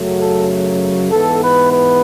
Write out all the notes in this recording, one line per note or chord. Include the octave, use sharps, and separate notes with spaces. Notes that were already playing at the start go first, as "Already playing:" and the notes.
Already playing: F#2 C#3 F#3 A3
A4
G#2 E3 B3 A4
B4
B4